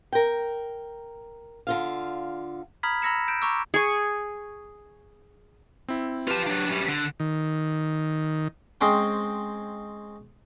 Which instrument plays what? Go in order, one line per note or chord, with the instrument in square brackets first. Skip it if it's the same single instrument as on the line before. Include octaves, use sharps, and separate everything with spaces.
[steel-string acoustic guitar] A#4 G5
D3 F4 F5
[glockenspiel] A#5 B5 D#6 F6 G#6 B6
A#5 B5 E6 A#6 C#7 E7
G6 D7 E7
A#5 C#6 D6 E6
[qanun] G#4 C#6
[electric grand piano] C4 E4
[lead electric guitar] F4 A5 [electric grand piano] G4 B4
[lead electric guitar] F#3 D4
F#2 G3
D3
[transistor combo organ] D#3
[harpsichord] G#3 C4 C#4 C5 G5